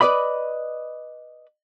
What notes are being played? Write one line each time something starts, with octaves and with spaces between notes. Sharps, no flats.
B4 C5 D5 D#5 B5